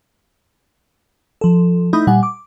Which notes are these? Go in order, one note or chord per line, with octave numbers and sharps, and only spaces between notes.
F3 A4
A3 D#4 E4 B5 D#6 G6
A#2 G3 F#5 G#5
D6